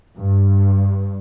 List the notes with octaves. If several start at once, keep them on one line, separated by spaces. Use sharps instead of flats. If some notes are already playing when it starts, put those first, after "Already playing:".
G2